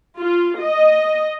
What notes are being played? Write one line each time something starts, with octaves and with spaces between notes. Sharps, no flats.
F4
D#5